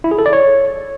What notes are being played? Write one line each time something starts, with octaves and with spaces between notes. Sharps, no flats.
E4
G#4
A4
D5
C#5